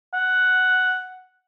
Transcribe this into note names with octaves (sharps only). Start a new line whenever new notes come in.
F#5